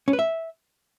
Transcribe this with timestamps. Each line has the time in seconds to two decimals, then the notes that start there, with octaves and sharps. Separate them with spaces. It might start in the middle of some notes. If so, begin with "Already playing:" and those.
0.08 C#4
0.13 B4
0.19 E5